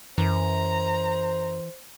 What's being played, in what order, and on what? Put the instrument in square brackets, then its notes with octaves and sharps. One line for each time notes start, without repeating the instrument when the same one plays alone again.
[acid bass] F#2 [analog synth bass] E3 [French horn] C5 [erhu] A#5